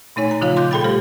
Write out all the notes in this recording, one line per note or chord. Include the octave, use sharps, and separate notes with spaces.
A#2 A3 D#4 C#5 G#5
A#5 A6
C#3 F3 F4 C#5 F5
C6 D6 F#6 G6
A#2 G#4 A4 G5 B5 A6
G3 A3 G4 C5